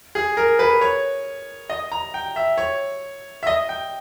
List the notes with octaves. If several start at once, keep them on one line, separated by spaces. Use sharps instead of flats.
G#4
A#4
B4
C#5
D#5
A#5
G5
E5
C#5
E5
D#5
G5